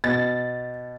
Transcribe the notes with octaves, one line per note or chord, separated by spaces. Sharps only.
B2 A6